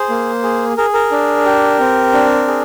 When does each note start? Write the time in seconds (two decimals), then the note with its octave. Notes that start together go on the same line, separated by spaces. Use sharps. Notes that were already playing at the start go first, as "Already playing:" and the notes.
Already playing: G#4 C5
0.09 A#3
0.43 G#4
0.78 G#4 A#4
0.94 A#4
1.11 D4
1.45 G4
1.80 C4
2.13 D4
2.48 G#4